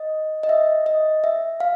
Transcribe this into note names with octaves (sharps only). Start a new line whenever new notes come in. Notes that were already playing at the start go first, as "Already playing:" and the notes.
Already playing: D#5
D#5
E5
D#5
E5
F5